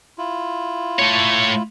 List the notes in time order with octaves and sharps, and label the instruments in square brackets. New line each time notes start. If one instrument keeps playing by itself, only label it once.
[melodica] E4 F4
[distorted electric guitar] A3 C#5